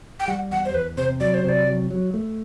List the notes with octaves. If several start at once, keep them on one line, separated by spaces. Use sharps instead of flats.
G5
G3 F#5
E2 F#5
C5
E2 B4
C3 C5
F#3 D5
C5
C3 D5
F#3
F#3
A3